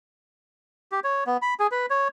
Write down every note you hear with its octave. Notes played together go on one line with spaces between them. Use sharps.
G4
C#5
B3
B5
G#4
B4
C#5